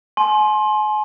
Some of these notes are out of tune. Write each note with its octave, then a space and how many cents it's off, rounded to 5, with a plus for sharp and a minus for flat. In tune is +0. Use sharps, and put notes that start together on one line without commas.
G#5 +40 C6 +20